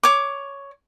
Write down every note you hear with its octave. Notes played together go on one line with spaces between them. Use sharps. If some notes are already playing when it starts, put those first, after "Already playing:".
C#5 D6